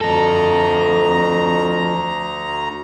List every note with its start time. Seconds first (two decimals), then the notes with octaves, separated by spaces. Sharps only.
0.01 D2 F3 A4 A#5